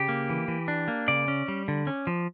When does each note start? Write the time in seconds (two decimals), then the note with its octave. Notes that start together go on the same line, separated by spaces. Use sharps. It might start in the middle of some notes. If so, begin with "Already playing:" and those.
Already playing: C#3 G4
0.09 A#3
0.30 E3
0.48 E3
0.68 D4
0.88 A#3
1.08 C#3 D5
1.28 C#4
1.48 G3
1.68 D3
1.87 C#4
2.07 F3